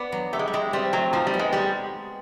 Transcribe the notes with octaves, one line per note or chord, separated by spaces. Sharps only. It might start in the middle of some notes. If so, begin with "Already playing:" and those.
Already playing: B3 D4
F#3
A3 G4
G#3
G3
G#3 E4
G3 C4
F#3 A3
F3 D#4
G3
B3
G#3
G3 G#3